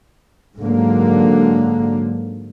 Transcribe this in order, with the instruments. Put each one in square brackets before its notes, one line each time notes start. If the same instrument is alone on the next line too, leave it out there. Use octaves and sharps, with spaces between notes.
[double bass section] G#2 D3 F#3 A#3